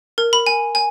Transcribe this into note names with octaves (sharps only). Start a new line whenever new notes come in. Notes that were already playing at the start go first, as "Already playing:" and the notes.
A#4
B5
G#5
G#5